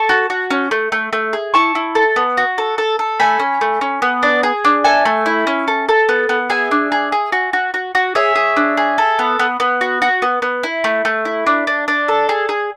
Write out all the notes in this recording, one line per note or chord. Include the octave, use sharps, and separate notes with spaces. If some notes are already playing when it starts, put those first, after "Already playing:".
Already playing: A4 A5 C#6
F#4
F#4
C#4
A3
A3
A3
G#4
E4 A5 C#6
E4
A4
B3
F#4
A4
A4
A4
A3 G#5 B5
C#4
A3
C#4
B3
D4
G#4
D4
A4 E5 G#5
A3
E4
C#4
A4
A4
B3
B3
G#4 E5 G#5
D4
G#4
G#4
F#4
F#4
F#4
F#4
G#4 C#5 E5
G#4
D4
G#4
A4
B3
B3
B3
F#4
F#4
B3
B3
E4
A3
A3
E4
D4
D4
D4
A4
G#4
G#4